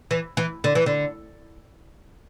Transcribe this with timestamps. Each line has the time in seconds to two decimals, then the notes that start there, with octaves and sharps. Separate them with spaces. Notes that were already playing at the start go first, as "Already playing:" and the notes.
0.11 E3
0.37 E3
0.64 D3
0.75 E3
0.86 D3